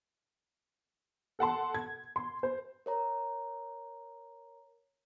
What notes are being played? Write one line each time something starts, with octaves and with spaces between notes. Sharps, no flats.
A4 F#5 A5 C6
G#6
C6
C5
A#4 C#5 A#5